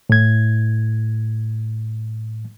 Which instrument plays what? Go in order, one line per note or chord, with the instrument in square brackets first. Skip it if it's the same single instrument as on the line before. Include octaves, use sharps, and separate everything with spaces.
[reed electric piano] A2 G#6